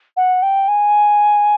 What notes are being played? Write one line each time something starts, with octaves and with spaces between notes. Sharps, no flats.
F#5
G5
G#5